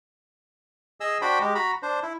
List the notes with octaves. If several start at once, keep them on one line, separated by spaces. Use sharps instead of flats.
G#4 D#5 E6
D4 F#4 C5 G5 B5
G#3 G4
F#4 A#5 B5
D4 C5
E4